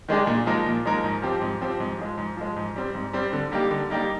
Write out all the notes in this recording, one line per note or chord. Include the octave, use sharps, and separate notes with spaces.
D#3 G#3 D4 G#4
A#2
F3 G#3 D#4 A#4
A#2
F3 G#3 D#4 A#4
G#2
F3 C4 G4
G#2
F3 C4 G4
G#2
F3 G#3
G#2
F3 G#3
G#2
G3 C4
G#2
G3 C4
D3
G3 A#3 D#4 G4
D3
G3 A#3 D#4 G4